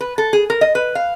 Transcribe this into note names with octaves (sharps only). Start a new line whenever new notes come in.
B4
A4
G#4
A#4
D#5
B4
F5